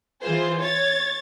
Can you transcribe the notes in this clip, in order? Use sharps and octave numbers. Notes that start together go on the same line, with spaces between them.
E3 F4 G#4 C5
C#5 G#6 A6